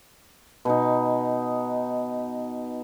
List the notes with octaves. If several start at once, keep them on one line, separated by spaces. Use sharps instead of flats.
B2 D#4